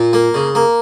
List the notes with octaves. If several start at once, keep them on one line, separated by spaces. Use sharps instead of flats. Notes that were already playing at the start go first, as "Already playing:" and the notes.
Already playing: A#2
A#3
C#3
A#3